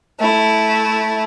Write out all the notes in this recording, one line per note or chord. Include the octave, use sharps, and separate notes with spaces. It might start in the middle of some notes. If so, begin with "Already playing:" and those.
A3 E4